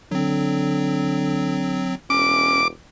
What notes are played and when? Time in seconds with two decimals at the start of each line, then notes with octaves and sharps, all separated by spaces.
0.11 D3 F#3 C4
2.10 E1 C#4 D6